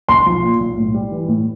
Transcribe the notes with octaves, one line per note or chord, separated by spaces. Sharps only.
B1 C6
F3
A#2
B1
A2
G3
E3
A2